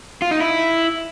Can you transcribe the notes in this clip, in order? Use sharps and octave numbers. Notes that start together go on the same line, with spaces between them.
F4
D#4
E4